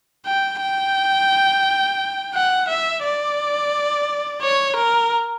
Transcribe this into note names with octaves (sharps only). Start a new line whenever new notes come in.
G5
G5
F#5
E5
D5
C#5
A#4